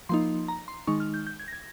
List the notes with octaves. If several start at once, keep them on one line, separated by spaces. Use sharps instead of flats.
F3 A#3 D#4 C6
A#5
C6
D#3 G#3 D#4 C#6
F6
G6
G6
G#6
A#6
G#6